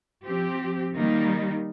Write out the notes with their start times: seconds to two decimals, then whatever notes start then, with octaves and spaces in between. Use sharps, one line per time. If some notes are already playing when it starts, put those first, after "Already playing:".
0.25 F3 C4 G4
0.94 D#3 G3 A#3 D#4